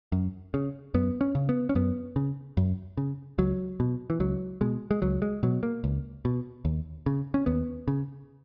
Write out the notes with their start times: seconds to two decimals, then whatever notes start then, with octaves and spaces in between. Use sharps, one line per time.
0.12 F#2
0.54 C#3
0.94 F#2 B3
1.21 C#4
1.35 C#3
1.49 B3
1.69 C#4
1.75 F#2 B3
2.16 C#3
2.57 F#2
2.97 C#3
3.38 C#2 F#3
3.80 B2
4.10 E3
4.20 C#2 F#3
4.61 B2 G#3
4.91 G#3
5.02 C#2 F#3
5.22 G#3
5.43 B2 F#3
5.63 A#3
5.84 C#2
6.25 B2
6.65 D#2
7.06 C#3
7.34 C#4
7.46 D#2 B3
7.88 C#3